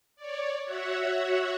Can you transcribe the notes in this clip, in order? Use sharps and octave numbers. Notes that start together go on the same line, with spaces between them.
C#5 D5
F#4 C#5 E5 F#5